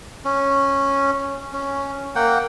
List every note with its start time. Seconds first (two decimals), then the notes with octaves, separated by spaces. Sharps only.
0.25 C#4
1.53 C#4
2.15 A#3 F#5 G5